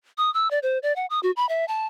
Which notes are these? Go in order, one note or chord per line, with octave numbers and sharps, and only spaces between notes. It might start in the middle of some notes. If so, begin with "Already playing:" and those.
D#6
E6
D5
C5
D5
F#5
D#6
F#4
B5
E5
A5